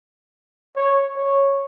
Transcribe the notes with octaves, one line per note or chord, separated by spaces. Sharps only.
C#5
C#5